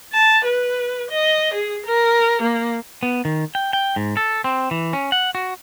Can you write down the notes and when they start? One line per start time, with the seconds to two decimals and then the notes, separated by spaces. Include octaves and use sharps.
0.14 A5
0.45 B4
1.11 D#5
1.54 G#4
1.86 A#4
2.42 A#3
3.03 B3
3.25 D#3
3.55 G5
3.73 G5
3.96 G#2
4.17 A4
4.44 C4
4.71 E3
4.93 C#4
5.12 F#5
5.35 F#4